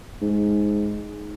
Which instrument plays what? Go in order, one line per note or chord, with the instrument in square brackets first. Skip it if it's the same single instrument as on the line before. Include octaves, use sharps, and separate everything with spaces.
[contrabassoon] G#2